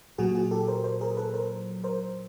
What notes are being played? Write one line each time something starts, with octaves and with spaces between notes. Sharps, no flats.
A#2 F#3 F#4 G#4
F#4 G#4
G4 A4
A#4 C5
A#4 C5
G#4 A#4
A4 B4
A#4 C5
A#4 C5